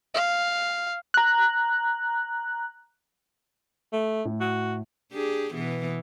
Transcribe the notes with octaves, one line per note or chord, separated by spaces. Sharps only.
F5
A#5 F#6
A3
A2
F#4
D4 G4 G#4
B2 E3 B3